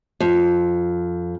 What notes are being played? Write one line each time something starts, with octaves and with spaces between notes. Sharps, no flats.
F2